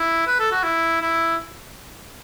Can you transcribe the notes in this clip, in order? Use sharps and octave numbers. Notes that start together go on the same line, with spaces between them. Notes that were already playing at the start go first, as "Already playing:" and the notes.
Already playing: E4
B4
A4
F#4
E4
E4